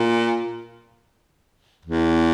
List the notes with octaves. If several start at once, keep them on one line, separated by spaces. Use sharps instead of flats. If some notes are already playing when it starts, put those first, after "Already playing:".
Already playing: A#2
E2